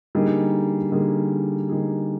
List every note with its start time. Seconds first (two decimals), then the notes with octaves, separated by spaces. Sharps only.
0.15 D3 G3 A#3 D#4 G#4
0.92 D3 G3 A#3 D#4 G#4
1.69 D3 G3 A#3 D#4 G#4